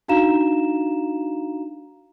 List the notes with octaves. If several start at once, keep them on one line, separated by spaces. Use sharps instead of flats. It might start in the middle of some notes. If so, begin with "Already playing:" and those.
D4 D#4 F#4 F5 A#5 E7